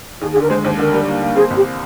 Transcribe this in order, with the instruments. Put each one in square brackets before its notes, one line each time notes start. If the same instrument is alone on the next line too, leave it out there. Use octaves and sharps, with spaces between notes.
[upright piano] D#2 [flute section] G#4
[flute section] G#4
[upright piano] D3
[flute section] A#4
[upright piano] G#3 [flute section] C5
[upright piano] D#2 [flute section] C5
[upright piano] D3 [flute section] A#4
[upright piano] G3
A#3
A#3
[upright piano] C4 [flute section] G#4
[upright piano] C2
[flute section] G4